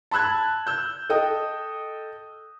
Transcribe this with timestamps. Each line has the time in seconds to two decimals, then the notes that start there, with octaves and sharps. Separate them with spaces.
0.11 A5 B5 E6 F#6 G#6
0.67 E6 G6
1.10 A4 D#5 G5 D#6